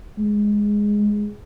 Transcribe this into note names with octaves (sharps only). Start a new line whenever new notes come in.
G#3